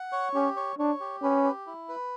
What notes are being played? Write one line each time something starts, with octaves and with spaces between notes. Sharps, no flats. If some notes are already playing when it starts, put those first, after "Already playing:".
Already playing: F#5
C#5
C#4 G4
C#5
D4 C#5
G4
C#4 B4
G4
E4
B4